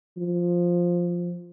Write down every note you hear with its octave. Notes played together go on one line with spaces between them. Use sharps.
F3